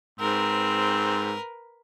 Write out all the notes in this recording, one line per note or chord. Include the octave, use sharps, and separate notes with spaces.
G#2 C4 A#4 B4